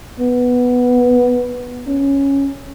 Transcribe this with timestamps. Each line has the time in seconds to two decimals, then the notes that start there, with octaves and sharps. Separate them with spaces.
0.20 B3
1.87 C#4